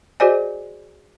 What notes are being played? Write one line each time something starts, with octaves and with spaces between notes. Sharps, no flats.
F#4 G#4 C5 D5 D#5 G#5